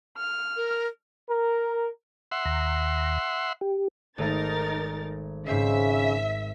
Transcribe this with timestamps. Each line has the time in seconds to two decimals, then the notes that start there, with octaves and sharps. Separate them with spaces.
0.17 F6
0.56 A#4
1.29 A#4
2.32 E5 F#5 C6
2.45 D#2 A#5
3.61 G4
4.18 G#1 A3 D#4 A#4 A6
5.47 G#2 C#3 C4 E5 B6 C7